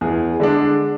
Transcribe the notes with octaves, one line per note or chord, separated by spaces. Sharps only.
E2 G#4
D3 G#3 D4